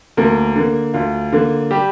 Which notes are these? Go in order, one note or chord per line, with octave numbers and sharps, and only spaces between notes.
D2 A#3 A#4
D3 A#3
D2 F4
D3 A#3
G3 G4